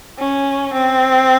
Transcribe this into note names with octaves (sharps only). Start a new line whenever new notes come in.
C#4
C4